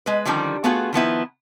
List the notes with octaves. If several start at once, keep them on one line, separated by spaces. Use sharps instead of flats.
G#3 B4
D3 D#3 F3 G3 C#4
A3 B3 F4 F#4 G#4
D#3 F3 B3 E4